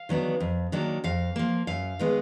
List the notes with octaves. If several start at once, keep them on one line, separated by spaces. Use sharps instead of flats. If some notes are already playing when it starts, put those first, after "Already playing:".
Already playing: F5
D#3 F#3 B3 D4
F2
D#3 F#3 A#3 D4
F2 F5
F3 A#3
F#2 F5
D#3 G#3 B3